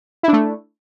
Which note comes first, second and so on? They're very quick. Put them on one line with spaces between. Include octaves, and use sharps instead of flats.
E4 D4 A3